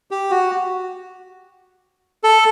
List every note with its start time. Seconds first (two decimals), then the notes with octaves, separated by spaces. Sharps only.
0.11 G4
0.30 F#4
2.24 A4